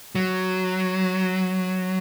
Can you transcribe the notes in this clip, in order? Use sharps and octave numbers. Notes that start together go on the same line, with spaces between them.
F#3